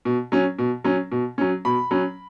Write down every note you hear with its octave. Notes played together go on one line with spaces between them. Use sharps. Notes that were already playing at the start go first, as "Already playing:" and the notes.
B2
F#3 C#4
B2
F#3 C#4
B2
F#3 C#4
B2 B5
F#3 C#4